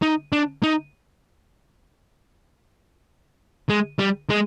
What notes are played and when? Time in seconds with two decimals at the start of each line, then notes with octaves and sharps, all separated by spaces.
0.02 D#4
0.32 D4
0.63 D#4
3.69 G#3
3.99 G3
4.30 G#3